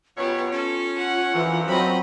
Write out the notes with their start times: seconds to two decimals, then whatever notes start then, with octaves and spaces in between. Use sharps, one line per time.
0.17 F#2 B2 B3 F4 G4 C#5
0.52 C#4 A4
0.97 F#5
1.34 F#2 D3 E3 F3
1.68 F#3 C4 D#5 B5